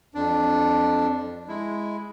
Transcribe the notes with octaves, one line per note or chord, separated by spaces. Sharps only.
F2 D4
G#3 E4